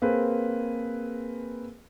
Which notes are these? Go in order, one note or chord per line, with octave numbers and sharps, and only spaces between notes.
A#3 C4 G#4 B4